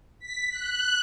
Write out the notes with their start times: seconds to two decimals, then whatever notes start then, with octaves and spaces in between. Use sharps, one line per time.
0.19 B6
0.50 F#6